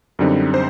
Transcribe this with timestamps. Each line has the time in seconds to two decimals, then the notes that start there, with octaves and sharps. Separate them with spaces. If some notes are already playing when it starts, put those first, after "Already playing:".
0.19 F#2 D3 G3 C4 D#4
0.54 C5